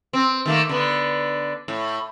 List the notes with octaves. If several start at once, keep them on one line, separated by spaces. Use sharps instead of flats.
C4
D#3 A3 A#3
D3 B3
A2